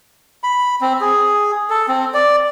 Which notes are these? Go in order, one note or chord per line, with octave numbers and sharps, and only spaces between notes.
B5
C4
G#4
A4
C4
D5